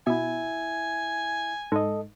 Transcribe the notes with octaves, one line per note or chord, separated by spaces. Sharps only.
B2 E4 E5 G#5
G#2 A4 D#5